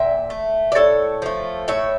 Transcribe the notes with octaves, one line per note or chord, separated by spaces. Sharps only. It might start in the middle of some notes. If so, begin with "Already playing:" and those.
Already playing: A#2 E5 G5
A3
D5
A2 A4 C#5
F3 A3
A2 C#5 E5